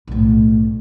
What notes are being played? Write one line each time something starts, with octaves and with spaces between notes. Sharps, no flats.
B1 A2